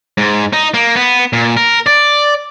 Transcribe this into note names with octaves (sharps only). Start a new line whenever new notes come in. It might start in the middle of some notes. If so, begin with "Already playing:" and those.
G#2
D#4
A#3
B3
A#2
A#4
D5